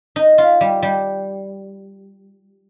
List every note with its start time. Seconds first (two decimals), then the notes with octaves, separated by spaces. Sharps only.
0.16 D#4
0.38 F4
0.61 G3
0.83 G3